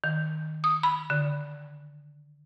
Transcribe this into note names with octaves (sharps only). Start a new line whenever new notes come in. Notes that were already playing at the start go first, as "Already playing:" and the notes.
D#3
D#6
B5
D3